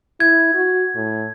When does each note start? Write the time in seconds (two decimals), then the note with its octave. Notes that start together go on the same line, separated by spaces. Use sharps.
0.20 E4 G#6
0.54 F#4
0.96 A2